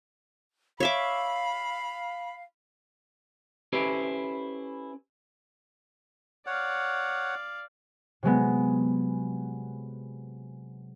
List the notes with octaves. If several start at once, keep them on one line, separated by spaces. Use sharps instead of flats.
C#5 E5 F5 B5 D6
C#4 E4 G4 A4 B4 C5
C#5 D5 F5 F#5
C3 F#3 G#3 B3